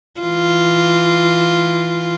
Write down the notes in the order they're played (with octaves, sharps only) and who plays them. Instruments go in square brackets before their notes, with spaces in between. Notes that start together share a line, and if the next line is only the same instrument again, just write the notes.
[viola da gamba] E3 F4